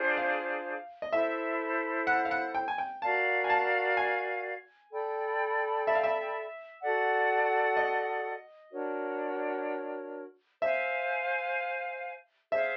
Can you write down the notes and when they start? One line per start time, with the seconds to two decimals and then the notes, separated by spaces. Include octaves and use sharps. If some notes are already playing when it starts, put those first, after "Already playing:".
Already playing: D4 F4 G#4 C5
0.17 F5
1.02 D#5
1.12 E4 A4 C5 E5
2.07 F#5
2.25 F5
2.31 F#5
2.55 G5
2.68 G#5
2.78 G5
3.02 F#4 A#4 D5 F5 A5
3.44 G#5
3.50 A5
3.97 G#5
4.92 A4 D5 G5 B5
5.87 E5
5.95 F5
6.03 E5
6.81 F#4 A4 D5 F#5
7.77 D#5
8.72 D4 F#4 A#4 C#5
10.62 C5 E5 F5 G#5
12.51 G#4 C5 E5 F5